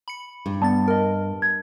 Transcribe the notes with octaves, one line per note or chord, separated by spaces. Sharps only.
B5 C#7
G2
G3 B3 A5 A6
A#4 D#5
G#6